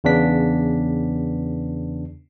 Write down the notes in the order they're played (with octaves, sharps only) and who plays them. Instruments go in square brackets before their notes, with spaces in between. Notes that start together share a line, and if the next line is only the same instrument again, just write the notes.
[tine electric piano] E2 C#3 B3 D4 B6